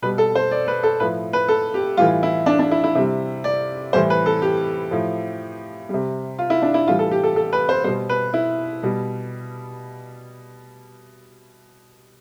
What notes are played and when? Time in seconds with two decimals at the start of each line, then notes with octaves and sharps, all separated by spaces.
0.02 B2 G3 B4
0.18 A4
0.35 C5
0.51 D5
0.68 B4
0.83 A4
1.00 A2 F3 B4
1.33 B4
1.48 A4
1.74 G4
1.97 A2 E3 G3 F4
2.23 E4
2.46 D4
2.59 D4
2.71 E4
2.84 E4
2.95 C3 G3
3.44 D5
3.93 A2 E3 G3 C5
4.10 B4
4.26 A4
4.42 G4
4.91 A2 F3
5.89 G3
5.94 C3
6.39 F4
6.50 E4
6.62 D4
6.74 E4
6.88 A2 E3 G3 F4
6.99 A4
7.11 G4
7.23 A4
7.36 A4
7.53 B4
7.69 C5
7.84 G3 C5
7.88 B2
8.10 B4
8.34 E4
8.83 B2 G3